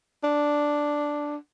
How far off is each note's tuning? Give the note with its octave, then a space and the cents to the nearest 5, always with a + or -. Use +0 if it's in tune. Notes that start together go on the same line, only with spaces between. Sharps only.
D4 +0